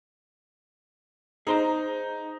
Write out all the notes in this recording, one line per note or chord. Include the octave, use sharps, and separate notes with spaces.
D#4 G#4 C5 A#5